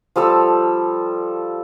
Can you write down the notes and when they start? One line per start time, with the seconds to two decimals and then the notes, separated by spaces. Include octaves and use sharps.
0.16 F3 G3 A4 E6